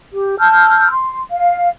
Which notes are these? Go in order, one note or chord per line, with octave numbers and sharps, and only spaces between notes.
G4
A5 E6 F6 G6
C6
F5